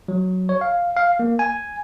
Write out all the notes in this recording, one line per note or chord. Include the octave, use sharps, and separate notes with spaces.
F#3
C#5
F5
F5
A#3
G#5